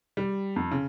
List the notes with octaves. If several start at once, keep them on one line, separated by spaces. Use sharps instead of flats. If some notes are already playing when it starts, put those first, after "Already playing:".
G3
F2
C#3